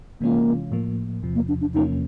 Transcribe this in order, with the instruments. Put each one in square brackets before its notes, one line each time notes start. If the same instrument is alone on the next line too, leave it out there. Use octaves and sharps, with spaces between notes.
[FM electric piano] C3 E3 G#3 C#4 F4 [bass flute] A#3
[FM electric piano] A2 F3 A#3
E2 C3 F3
[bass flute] A#3
D4
D4
[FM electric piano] E2 C3 F3 A#3 C#4 [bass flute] D#4